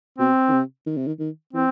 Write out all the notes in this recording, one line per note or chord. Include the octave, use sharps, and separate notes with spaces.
B2 C4
D#3
C3
D#3
C3
D#3
D#3
E3 C4